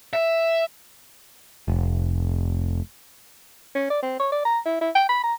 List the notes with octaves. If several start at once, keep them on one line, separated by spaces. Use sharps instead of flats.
E5
F1
C#4
D5
C4
C#5
D5
A#5
E4
E4
G5
B5
A#5